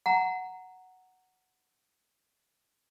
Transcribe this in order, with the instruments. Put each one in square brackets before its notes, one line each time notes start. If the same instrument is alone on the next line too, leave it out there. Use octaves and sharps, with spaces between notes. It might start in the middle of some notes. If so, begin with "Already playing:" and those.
[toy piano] F#5 A#5